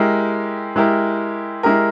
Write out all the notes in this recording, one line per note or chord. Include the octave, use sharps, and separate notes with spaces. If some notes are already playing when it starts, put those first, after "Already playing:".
Already playing: G#3 E4 G4 A#4
G#3 E4 G4 A#4
G#3 E4 G4 A#4